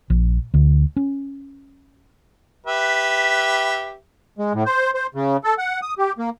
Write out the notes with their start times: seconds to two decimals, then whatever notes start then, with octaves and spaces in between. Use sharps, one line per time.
0.10 A#1
0.54 D2
0.96 C#4
2.67 G4 B4 E5
4.39 G#3
4.54 A2
4.66 C5
4.94 C5
5.15 C#3
5.44 A4
5.58 F#5
5.82 D#6
5.98 G4
6.18 A#3